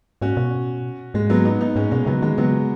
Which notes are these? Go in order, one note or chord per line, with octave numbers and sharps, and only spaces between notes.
G#2 C#4 F#4
B2
G#2 G#3
F#3 B3
B3 D#4
B3 D#4
G#2 G#3 C#4
B2 G#3 C#4
C#3 F#3 B3
D#3 G#3
C#3 F#3 B3